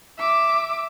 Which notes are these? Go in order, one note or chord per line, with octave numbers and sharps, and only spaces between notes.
E5 D6